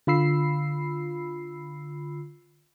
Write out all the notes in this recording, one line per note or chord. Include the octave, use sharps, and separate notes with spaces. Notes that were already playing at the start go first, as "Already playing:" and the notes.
D3 F4 B5 E6 C7